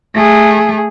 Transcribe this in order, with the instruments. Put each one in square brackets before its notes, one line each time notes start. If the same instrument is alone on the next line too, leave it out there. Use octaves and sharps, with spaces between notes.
[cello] A3 G#4